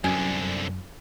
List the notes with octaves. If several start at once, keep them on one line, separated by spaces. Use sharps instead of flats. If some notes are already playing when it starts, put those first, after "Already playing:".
C2 F#2 D3 G#5